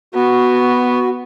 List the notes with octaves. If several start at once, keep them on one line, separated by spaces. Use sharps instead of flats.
B3 F#4